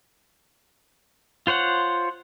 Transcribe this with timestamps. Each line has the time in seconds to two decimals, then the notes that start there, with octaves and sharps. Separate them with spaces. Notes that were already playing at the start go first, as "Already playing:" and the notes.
1.47 F4 C5 C#5 F#5